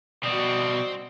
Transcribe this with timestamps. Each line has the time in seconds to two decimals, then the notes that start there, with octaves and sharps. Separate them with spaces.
0.23 B2 G3 C4 F#4 D5 D#5